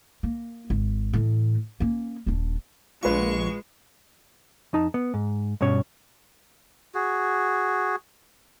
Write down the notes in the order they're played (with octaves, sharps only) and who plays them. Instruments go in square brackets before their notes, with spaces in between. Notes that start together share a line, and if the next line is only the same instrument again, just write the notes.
[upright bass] A#3
G#1
A2 E3
A#3 C#4
D#1 D4
[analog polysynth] A#1 C#6 [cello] G#3 [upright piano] F4 B4
[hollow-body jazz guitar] F2 D#4 A5
B3
G#2
G2 B2 C#4 C#5
[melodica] F#4 G#4